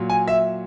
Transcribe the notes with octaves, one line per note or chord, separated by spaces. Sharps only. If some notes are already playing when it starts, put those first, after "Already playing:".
Already playing: A#2 F#3
G#5
E5